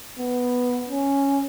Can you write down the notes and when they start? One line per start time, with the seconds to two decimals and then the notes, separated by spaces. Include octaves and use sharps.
0.18 B3
0.89 C#4